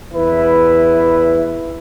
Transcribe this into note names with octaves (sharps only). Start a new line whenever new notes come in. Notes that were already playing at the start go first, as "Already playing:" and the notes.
E2 E4 B4